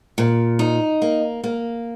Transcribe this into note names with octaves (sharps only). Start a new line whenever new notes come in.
A#2
D#4
A#3
A#3